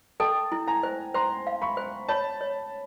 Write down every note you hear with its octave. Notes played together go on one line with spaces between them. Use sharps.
A4 G5 A5
E4
G#5 A#5
C5
C5 A#5 C6
F5
B5 C#6
C5
C#5 A5 B5
C#5